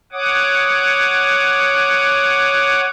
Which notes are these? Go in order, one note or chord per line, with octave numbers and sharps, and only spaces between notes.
C#5 F#5 D6 D#6